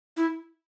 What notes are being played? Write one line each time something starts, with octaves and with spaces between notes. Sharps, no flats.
E4